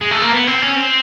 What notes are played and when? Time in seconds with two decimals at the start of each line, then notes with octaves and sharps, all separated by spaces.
0.01 G#3
0.11 A3
0.21 A#3
0.32 B3
0.47 C4
0.62 C#4
0.76 C4